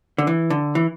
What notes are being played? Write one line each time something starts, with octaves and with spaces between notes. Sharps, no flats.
D3
E3
D3
E3